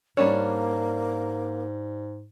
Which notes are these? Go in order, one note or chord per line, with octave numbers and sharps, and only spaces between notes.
G#2 G3 A#3 C#4 D4 C#5